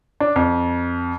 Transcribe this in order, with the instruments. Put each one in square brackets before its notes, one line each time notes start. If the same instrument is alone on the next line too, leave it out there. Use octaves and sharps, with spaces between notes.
[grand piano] D4
F2